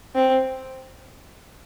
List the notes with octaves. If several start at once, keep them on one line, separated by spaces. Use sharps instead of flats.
C4